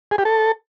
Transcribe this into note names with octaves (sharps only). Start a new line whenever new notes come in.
G#4
G4
A4